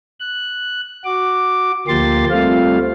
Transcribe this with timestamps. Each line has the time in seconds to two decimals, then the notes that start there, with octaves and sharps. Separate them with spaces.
0.20 F#6
1.05 F#4 D6
1.88 D2 F3 A#3 G4 C6 A6
2.30 G3 A3 C4 F4 F5